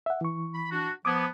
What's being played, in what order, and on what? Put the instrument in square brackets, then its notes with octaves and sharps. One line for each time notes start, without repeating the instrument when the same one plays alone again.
[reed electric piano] E5 F#5
E3 C#6
[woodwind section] B5
D4 F#4
[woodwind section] F3 B3 [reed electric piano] D6 D#6 G#6